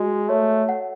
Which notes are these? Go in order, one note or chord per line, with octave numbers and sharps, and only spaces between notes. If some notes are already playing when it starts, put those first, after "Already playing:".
Already playing: G#3 F#4
A3 C#5
F#5